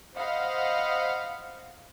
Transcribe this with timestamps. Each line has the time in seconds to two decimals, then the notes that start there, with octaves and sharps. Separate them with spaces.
0.16 C5 D#5 F5 F#5 B5